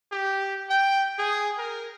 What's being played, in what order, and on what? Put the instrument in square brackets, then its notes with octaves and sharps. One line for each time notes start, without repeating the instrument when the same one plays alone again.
[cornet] G4
G5
G#4
A#4